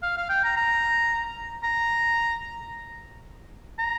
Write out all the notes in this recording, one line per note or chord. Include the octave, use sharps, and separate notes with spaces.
F5
F5
G5
A#5
A#5
A#5
A#5